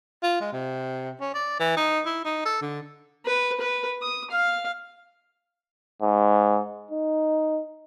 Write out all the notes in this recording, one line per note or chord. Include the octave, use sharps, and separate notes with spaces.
F4
G#3
C3
C#4
D5
E3
D#4
E4
D#4
A4
D3
B4
B4
D#6
F5
G#2
D#4